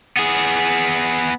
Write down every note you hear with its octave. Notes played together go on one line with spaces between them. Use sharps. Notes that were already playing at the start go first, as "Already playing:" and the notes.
B3 G#4